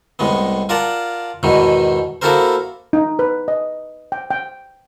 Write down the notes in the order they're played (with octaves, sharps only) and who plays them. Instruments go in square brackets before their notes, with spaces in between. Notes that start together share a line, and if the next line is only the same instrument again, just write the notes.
[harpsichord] C2 A2 G#3 B3
F4 A#4 D5 F#5 A5
E2 G#2 B2 D#3 E3
A#3 E4 F#4 A4 A#4 C5
[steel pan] D#4
B4
D#5
G5
G5